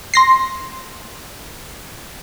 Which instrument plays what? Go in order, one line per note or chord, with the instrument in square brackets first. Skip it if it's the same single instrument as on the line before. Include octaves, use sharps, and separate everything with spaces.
[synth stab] C6 A#6 C7